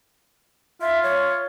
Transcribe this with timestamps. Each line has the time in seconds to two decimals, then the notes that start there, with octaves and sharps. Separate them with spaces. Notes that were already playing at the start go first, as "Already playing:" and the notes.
0.81 F4 E5
1.03 C#5